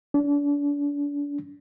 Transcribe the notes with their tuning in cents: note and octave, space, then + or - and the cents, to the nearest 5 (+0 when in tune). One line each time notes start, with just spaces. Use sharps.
D4 -35